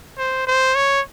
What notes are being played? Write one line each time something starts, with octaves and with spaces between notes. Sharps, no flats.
C5
C5
C#5